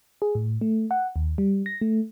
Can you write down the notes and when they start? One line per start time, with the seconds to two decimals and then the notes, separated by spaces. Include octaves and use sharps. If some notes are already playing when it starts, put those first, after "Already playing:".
0.22 G#4
0.35 A2
0.61 A3
0.91 F#5
1.16 D#2
1.38 G3
1.66 A#6
1.81 A3